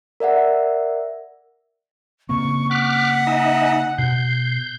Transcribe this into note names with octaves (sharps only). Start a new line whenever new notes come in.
A#4 D5 E5 F#5
C#3 A#3 C4 C#6
F#5 D6 F6 F#6 B6
D#4 D#5 E5 G#5
B2 G6 C7